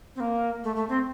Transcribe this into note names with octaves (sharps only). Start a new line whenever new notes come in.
C4
A#3
A3
A3
C4